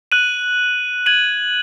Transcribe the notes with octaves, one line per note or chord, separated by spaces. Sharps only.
F#6 D#7 F#7
G#6 D#7 F#7